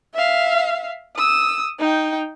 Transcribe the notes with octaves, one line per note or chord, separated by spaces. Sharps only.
E5 F5
D#6 E6
D#4 G5